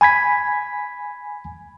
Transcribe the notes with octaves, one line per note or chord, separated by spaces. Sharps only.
G#5 B5 G#6 B6